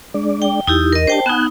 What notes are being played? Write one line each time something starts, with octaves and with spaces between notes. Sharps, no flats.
G#3 D4 D5
G5
E2 D#4 E4 G4
A#4 D#5
D4 G4 C5 G5 A5
B3 D#4 F#5 G#5 F#6